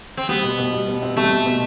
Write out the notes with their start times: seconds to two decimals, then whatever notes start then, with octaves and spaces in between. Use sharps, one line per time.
0.17 C4
0.29 G3 B3
0.43 B2
0.59 B2
0.73 G3
0.88 B2
1.02 C4
1.16 G3 A3
1.31 B2
1.46 B2